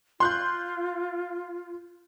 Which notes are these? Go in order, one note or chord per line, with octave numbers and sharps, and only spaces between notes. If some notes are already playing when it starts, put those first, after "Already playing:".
F4 C6 F#6 G6